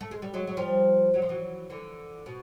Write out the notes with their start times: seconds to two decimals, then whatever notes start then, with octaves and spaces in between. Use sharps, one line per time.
0.01 A3
0.11 G#3
0.22 G3
0.34 F#3 G#3
0.47 F#3
0.57 F3 G3
1.14 F#3
1.22 F3
1.29 E3 F#3
1.70 D3 E3
2.26 B2